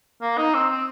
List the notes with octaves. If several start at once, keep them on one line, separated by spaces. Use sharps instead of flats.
A#3
D#4
C4
C4